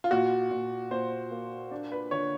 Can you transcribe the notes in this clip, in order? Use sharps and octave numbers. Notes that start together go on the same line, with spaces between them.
F4
A#2 F#4
A#2
A#2 C5
A#3
D4
B4
D3 C#5